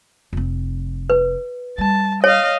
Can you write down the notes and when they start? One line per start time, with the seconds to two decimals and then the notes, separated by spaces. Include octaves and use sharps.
0.33 F1 C4
1.10 B4
1.78 G3 A5
2.24 C#5 D#5 F5